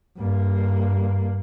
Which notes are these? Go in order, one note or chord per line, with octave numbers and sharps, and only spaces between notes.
G2 A#3